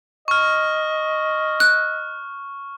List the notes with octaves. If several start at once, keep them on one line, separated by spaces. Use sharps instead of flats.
D#5 C#6 F6
F#6